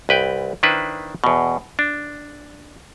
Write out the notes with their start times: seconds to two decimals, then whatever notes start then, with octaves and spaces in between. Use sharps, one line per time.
0.09 C2 B4 G5
0.63 D#3 D4 E4 B4 C5
1.24 E2 B2
1.79 D4